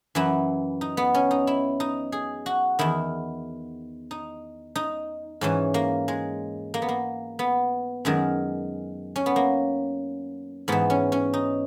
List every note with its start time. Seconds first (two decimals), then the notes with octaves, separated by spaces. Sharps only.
0.15 F#2 E3 E4
0.81 D#4
0.97 B3
1.15 C#4
1.31 D#4
1.47 E4
1.80 D#4
2.12 G#4
2.46 F#4
2.79 E2 D#3 E4
4.11 D#4
4.76 D#4
5.41 G#2 E3 C#4
5.74 A#3
6.08 G#3
6.74 A#3
6.82 B3
6.89 A#3
7.39 B3
8.05 F#2 D#3 G#3
9.16 C#4
9.26 B3
9.36 A#3
10.68 G#2 E3 B3
10.90 C#4
11.12 C#4
11.34 D#4